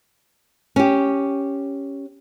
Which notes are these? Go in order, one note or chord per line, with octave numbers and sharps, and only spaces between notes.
C#4 G4